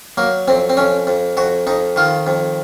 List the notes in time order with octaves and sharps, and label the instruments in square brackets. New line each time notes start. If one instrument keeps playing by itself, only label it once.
[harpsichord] F#3 A#3
F2 C4
C4
F2 C#4
F2
F2 F#4
F2 D#4
D#3 F4
F2